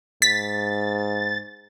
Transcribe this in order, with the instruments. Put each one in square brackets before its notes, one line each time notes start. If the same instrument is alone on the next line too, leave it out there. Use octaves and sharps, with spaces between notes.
[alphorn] G#2 [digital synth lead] A6 [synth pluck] B6